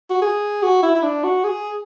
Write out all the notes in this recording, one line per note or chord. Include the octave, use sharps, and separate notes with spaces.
F#4
G#4
F#4
E4
E4
D4
F#4
G#4